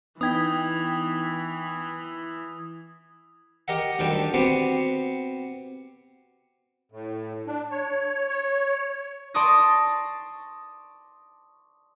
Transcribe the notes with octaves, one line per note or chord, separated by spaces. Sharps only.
E3 B3 D#4 G5 D#6 G#6 B6
G4 A#4 D#5 F#5
D2 D3 D#3 G3 G5 A5
B3 C4 F#4 G4
A2
D4
C#5
C#5
D5 A5 C6 C#6 D#6 A#6